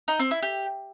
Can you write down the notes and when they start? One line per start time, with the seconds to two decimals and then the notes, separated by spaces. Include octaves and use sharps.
0.08 D#4
0.19 C4
0.31 E4
0.43 G4